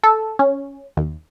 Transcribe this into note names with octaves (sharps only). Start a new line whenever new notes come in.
A4
C#4
D#2